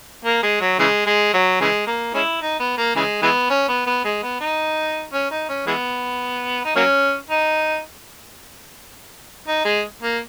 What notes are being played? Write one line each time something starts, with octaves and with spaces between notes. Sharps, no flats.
A#3
G#3
F#3
C#3 E3 G#3
G#3
F#3
C#3 E3 G#3
A#3
G#3 C#4 E4
D#4
B3
A#3
C#3 E3 G#3
E3 G#3 B3
C#4
B3
B3
G#3
B3
D#4
C#4
D#4
C#4
E3 G#3 B3
D#4
F#3 A#3 C#4
D#4
D#4
G#3
A#3